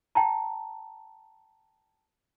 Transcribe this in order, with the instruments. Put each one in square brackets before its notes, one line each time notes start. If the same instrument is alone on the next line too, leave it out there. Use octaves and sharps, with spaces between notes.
[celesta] G5 A5 A#5